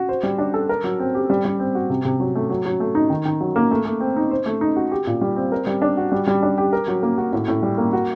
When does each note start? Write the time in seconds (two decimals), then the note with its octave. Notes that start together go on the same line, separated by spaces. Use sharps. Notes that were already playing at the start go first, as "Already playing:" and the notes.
Already playing: F#4
0.09 C5
0.23 G3
0.38 D4
0.54 A4
0.69 A#4
0.84 F#3
1.00 C4
1.15 G4
1.30 G3
1.45 G3
1.60 C4
1.75 F#4
1.90 C3
2.05 C3
2.20 F#3
2.35 A3
2.50 F#3
2.65 F#3
2.80 A3
2.95 D#4
3.10 D#3
3.25 D#3
3.41 F#3
3.56 A#3
3.71 A3
3.85 A3
4.00 C4
4.16 D#4
4.31 C5
4.46 A3
4.61 D#4
4.76 F#4
4.91 G4
5.07 A#2
5.21 G3
5.36 C4
5.52 A#4
5.67 G3
5.82 D4
5.97 F#4
6.12 G3
6.27 G3
6.43 D4
6.58 G4
6.73 A#4
6.88 F#3
7.03 A#3
7.18 F#4
7.33 A2
7.48 A2
7.62 G3
7.78 A#3
7.93 F#4